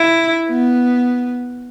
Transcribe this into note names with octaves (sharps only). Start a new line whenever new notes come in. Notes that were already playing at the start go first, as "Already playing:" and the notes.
Already playing: E4
B3